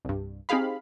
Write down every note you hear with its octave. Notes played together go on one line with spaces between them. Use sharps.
C2 G2
C4 D#4 G4 G#4 F5 B5